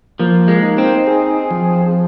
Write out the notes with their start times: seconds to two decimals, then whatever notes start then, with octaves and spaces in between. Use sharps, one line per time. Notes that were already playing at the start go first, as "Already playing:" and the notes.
0.19 F3 A#3
0.48 G#3
0.63 D#4
0.78 C4
1.07 G#4
1.51 F3